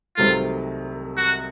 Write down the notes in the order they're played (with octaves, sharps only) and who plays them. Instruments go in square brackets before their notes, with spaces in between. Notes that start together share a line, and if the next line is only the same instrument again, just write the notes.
[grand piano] C2 C3 D#3 F#3 A3 [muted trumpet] F4
[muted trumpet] F#4